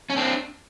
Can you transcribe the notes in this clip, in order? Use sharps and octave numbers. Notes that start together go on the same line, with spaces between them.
C#4
C4 D4